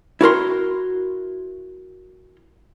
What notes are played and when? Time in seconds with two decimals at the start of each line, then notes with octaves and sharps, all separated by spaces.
0.21 E4 F#4 A#4 C6